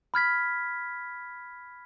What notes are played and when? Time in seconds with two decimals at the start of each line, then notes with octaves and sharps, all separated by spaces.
0.14 B5 F6 G#6 B6